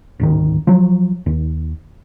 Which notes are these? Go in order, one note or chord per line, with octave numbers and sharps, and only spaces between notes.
D1 G#1 D#3
F3 F#3
D#2